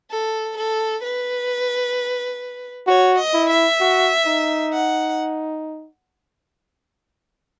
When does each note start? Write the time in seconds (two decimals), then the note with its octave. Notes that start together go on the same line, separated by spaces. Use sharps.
0.11 A4
0.57 A4
1.03 B4
2.87 F#4 C#5
3.18 D#5
3.34 E4
3.49 E5
3.80 F#4
4.27 D#4
4.72 F#5